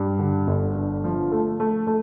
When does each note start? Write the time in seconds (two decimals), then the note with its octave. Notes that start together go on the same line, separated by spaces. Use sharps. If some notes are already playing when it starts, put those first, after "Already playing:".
Already playing: G2
0.19 D3
0.47 G1
0.75 D3
1.04 F3
1.32 A3
1.60 A3
1.87 A3